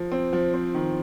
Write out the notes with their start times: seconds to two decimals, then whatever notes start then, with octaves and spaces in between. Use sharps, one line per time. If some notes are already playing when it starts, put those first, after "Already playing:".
Already playing: F3
0.12 C4
0.33 F3
0.54 C4
0.74 D#3